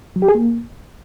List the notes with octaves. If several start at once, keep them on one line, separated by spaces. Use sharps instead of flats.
F#3
G4
G#4
A#3